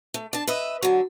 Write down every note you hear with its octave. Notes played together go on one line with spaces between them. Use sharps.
A3
D4 A5
B4 D#5 E5
D3 F#3